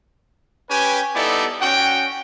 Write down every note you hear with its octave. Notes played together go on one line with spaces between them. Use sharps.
C#4 G4 B4 G5 G#5
G3 B3 D#4 E4 A4 D5
C#4 F#4 G5